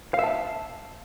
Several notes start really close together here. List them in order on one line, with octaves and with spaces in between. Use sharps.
F5 E5 A5